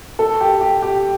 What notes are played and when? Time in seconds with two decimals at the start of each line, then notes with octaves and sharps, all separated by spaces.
0.19 A4
0.41 G4
0.61 G4
0.82 G4